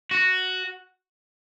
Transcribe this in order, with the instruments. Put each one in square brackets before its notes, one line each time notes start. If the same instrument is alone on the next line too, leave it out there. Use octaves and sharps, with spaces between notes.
[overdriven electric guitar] F#4